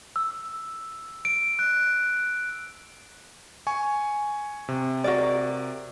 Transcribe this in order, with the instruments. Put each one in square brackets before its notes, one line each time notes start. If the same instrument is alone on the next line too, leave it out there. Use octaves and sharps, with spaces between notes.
[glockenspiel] E6
D7
F#6
[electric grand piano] G#5 C#6
C3
[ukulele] F#4 A#4 D5